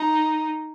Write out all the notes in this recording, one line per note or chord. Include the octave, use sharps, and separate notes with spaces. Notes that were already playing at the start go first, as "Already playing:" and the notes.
Already playing: D#4